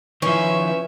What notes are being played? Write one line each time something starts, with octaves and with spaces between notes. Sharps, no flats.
D#3 F3 C#4 E4 B4 E5